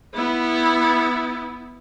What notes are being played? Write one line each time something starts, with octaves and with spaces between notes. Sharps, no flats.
B3 E4